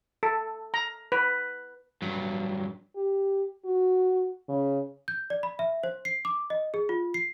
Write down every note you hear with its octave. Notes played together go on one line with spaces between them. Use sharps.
A4
A#5
B4
G2 F#3
G4
F#4
C#3
G6
D5
B5
E5
C5
C7
D6
D#5
G#4
F4
C7